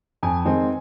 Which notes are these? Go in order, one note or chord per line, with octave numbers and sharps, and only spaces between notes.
F2 G#5
D#3 G#3 C4 D#4